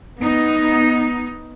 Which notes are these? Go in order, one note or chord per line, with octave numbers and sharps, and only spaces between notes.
B3 D#4